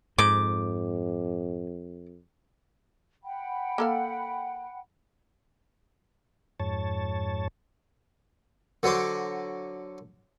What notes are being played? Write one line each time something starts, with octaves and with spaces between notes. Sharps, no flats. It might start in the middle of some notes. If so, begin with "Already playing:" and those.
F2 G#2 D6
F#5 G5 B5
A#3 A4 F5
F2 G#2 C#5 A5
D3 F#3 F#4 C5 D6